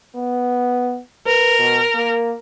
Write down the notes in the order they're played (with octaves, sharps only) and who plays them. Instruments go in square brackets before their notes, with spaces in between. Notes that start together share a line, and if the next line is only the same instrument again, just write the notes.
[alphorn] B3
[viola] A#4 [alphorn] B4
[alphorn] B2
A#3